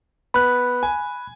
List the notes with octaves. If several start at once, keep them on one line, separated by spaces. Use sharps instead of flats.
B3 B5 F#6
G#5